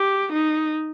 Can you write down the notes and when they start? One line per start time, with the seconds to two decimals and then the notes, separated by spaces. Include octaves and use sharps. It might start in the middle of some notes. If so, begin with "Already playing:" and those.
Already playing: G4
0.32 D#4